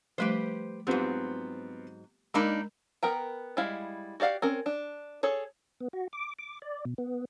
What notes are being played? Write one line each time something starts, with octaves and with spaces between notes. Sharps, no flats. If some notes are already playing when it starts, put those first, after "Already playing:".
F3 G3 A3 G4 B4 C5
G#2 F#3 B3 C4 F4 G4
G#3 A#3 D4 D#4 A#4 A#5 B5
B3 A#4 G5 A#5
G3 G#3 E4 F5
F#4 G4 D5 F5 F#5
C4 C#4 A#4
D4
G#4 A4 C#5
B3
F#4
D6
D6
D5
B2
B3